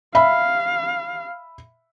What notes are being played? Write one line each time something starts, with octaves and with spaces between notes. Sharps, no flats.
E5 F5 B5